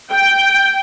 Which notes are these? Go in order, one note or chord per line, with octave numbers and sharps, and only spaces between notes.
G5